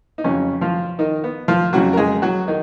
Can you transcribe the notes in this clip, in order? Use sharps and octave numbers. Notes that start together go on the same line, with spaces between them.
D#4
F2 C#3 F#3 C#4
F3 F4
D#3 D#4
B3
F3 F4
F2 C#3 F#3 F#4
A#4
G#3 G#4
F#3 F#4
D#3 D#4